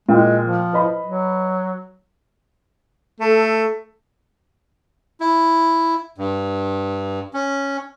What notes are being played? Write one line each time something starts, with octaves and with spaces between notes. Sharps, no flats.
A#2 G#3 G5
F3
B4 D#5 B5
F#3
A3 A4
E4
G2
C#4